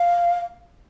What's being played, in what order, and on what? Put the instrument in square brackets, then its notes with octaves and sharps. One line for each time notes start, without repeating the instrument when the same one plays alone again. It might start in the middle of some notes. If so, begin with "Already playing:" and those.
Already playing: [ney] F5